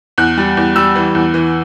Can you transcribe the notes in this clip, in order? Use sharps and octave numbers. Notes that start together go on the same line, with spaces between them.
E2 F#6
G3
E2
G3 E6
E3
E2
E3